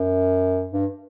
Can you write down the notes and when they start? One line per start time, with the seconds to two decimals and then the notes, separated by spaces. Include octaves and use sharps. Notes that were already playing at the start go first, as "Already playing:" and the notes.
Already playing: F#2
0.72 G2